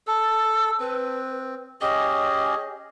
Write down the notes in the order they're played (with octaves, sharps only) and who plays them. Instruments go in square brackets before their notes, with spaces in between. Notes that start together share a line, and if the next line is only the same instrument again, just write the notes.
[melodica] A4 [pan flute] E6
[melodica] C4 [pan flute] B4
[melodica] C#4 G4 G#4 [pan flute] D#5